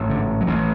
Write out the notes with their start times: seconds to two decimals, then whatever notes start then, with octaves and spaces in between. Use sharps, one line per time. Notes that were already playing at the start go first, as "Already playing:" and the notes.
Already playing: A1 G#2
0.10 D3
0.41 F#3
0.47 A1 E3